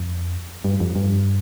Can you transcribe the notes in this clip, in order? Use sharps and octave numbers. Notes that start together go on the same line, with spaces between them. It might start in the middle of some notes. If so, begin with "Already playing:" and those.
Already playing: F2
G2
F2
G2